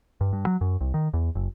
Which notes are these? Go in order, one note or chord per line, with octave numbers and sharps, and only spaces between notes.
G2
G2
F#3
F#2
C2
D#3
E2
F#1